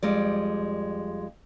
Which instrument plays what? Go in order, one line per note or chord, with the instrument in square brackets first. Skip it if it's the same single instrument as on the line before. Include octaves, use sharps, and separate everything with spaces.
[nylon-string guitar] F2 G3 G#3 D5